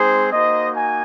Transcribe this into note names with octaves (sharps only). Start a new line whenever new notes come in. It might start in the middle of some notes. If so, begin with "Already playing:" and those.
Already playing: G#3 C4 D#4 G#4 C5
A#3 D#4 F#4 C5 D#5
G#5